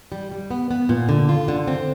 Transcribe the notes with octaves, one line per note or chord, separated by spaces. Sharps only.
G3
G3
B3
B3
A#2
D3
F4
D3
C4